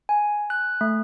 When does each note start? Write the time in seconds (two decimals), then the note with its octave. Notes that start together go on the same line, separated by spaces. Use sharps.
0.09 G#5
0.50 F#6
0.81 A3